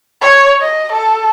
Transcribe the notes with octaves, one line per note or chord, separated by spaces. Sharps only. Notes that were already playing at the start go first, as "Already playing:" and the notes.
C#5
D#5
A4